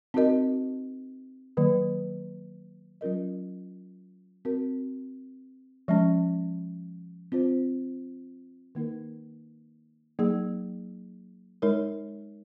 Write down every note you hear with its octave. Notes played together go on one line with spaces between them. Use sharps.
C4 D#4 F#4 A#4 D#5
D#3 F#3 A#3
F#3 C#4 F4 A#4 D#5
C4 F#4 A#4
F3 G#3 C#4
C4 F4 C5
D#3 A#3 D#4 A#4
F#3 A#3 D#4 G#4
G#3 D#4 A#4 C#5